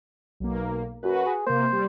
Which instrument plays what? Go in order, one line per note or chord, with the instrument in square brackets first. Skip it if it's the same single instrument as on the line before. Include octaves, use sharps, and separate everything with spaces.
[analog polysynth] B1 A#3
[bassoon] F#2 [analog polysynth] F#4 B4
[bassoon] G#4
[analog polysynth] C3 A#3 [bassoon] C5
[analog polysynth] G3